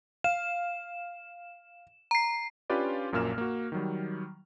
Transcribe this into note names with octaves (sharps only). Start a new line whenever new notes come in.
F5 E7
A#5 C7
C#4 D4 F4 G4 B4 D5
A#1 F#2 A#2 A#3 F6 E7
A#3 F#4
D#3 F#3 G3